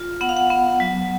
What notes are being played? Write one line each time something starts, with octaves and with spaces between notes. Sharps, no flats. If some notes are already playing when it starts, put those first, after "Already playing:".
Already playing: F4
B3 F#5
F5
F#5
B3
F#3